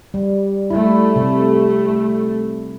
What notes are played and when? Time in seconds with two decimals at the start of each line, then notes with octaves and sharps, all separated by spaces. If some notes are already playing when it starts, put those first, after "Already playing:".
0.14 G3
0.70 G3 A3 E4
1.16 C3